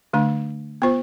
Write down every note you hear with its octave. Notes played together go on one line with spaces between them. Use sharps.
D3 A3 D4
B3 F4 C5